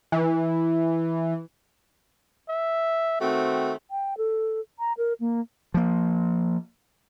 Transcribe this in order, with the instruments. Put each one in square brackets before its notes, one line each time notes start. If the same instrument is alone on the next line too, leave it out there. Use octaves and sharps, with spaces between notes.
[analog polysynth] E3
[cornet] E5
[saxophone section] D#3 A3 C4 [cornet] F#4
[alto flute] G5
A4
A#5
A#4
A#3
[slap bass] F3 A#3